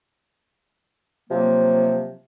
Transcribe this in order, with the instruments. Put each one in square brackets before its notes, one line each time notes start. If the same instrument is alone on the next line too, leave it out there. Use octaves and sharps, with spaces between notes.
[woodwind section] C3 F3 F#3 A#3